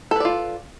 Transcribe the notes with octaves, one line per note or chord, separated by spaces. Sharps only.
F4 A4 B4 D5